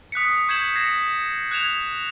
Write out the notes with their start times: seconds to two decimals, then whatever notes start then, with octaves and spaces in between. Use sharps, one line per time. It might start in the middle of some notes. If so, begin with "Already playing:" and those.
0.12 D#6 F#6 B6 C#7
0.49 C#6 G6 G#6 C7 E7 F#7
0.76 G#6 A#6 C7 C#7 E7
1.51 F#6 G#6 E7 F7